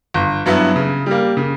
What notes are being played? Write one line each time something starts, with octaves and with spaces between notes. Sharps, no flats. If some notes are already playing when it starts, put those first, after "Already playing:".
G1
G2 F#3 B3 E4
C#3
G3 A#3
C#3